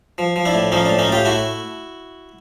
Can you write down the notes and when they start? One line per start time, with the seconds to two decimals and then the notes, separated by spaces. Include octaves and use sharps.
0.18 F3
0.36 F3
0.45 D4 E4
0.54 A2
0.72 F3 C#4 D#4
0.85 A2 D4
0.99 C#4 D#4
1.08 A2 F4 G4
1.25 A3 E4 F#4